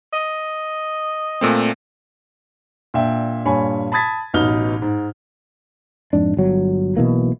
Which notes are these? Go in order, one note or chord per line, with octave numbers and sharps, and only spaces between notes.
D#5
A#2 A3 C4
A#2 D4 E5 G5
G2 A#2 C#5 G#5 B5
A5 B5 D#6 G#6 A6 B6
A1 B2 B3 D#4 F6 G7
G#2
F2 G#2 D4
G1 F#3
B1 B2 E3 A#3